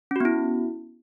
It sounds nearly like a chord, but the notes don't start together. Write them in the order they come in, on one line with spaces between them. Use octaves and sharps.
C#4 F#4 B3 E4